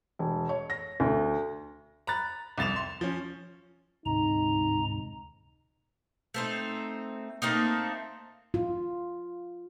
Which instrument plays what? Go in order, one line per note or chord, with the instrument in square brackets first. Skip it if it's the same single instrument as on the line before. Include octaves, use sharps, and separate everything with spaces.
[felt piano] E1
C#5
A#6
D2
[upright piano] A#5 B5 F#6 A6
C2 F2 A6 E7 F7
C6
F3 C#4
[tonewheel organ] D2 G#2 C3 [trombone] D#4 [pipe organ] A#5
[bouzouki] A3 C4 D#4
A3 A#3 C4 D#4
[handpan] F4